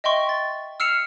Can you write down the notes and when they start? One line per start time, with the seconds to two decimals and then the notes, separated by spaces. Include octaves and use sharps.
0.04 D#5 E5 G5 C6 C#6
0.29 A6
0.80 E6 F6 C7 C#7 E7 F7